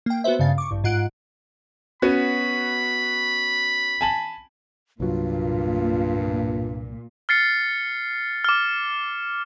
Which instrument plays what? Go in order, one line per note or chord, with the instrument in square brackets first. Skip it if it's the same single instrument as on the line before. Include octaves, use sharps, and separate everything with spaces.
[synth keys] A#3 G5
B3 F#4 B4 C5 E5
G2 C#3 F5 A6
C#6 D6
A1 G2
G#2 F4 F#5 F#6 D7
[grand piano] B3 C#4 F#4 [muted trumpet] B5
[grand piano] G#5 A5 F#7
[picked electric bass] C2 F#3 [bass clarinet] G2 [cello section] A#2 [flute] F4
[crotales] F6 A6 C7 C#7
D6 F6